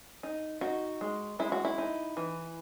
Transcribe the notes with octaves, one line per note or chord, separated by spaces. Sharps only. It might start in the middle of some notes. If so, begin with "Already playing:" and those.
D#4
D#4 F#4
G#3
G#3 E4
F#4
E4
D#4
E3